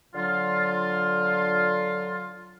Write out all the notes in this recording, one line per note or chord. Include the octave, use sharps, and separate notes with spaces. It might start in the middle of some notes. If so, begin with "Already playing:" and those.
D3 F#3 F4